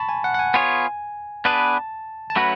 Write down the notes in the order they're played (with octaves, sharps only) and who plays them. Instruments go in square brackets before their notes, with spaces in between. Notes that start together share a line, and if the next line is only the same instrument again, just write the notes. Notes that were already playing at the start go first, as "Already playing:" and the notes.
Already playing: [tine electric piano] A5 B5 C#6
G#5
F#5
F#5
G#5
[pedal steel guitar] B3 F4 G#4 C#5 [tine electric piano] G#5
[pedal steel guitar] B3 D4 G#4 B4 [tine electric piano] A5
[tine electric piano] A5
[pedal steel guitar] F#3 A3 C#4 F#4 B4 [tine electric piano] B5